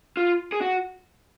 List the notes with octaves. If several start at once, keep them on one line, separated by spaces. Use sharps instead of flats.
F4
G#4
F#4